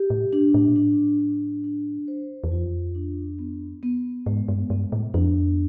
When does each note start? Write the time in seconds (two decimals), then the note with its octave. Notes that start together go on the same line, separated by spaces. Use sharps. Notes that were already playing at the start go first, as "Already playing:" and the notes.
Already playing: G4
0.10 A2
0.33 D4
0.54 A2
0.67 A#2
0.76 A2 D4
1.20 D4
1.64 D4
2.08 C5
2.44 E2
2.51 F2 F4
2.95 D4
3.39 B3
3.83 B3
4.26 G#2 G#3
4.48 G2
4.70 G2 B3
4.92 A2
5.14 F2 D4